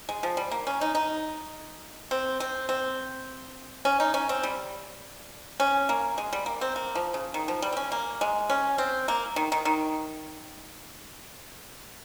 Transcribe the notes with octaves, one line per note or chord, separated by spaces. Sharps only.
G#3
F3
G3
A#3
C#4
D#4
D#4
C4
C4
C4
C#4
D#4
C#4
C4
G3
C#4
A#3
G#3
G3
A#3
C4
A#3
F3
C#3
D#3
F3
G3
C4
C#4
A#3
G#3
C#4
C4
A#3
D#3
D#3
D#3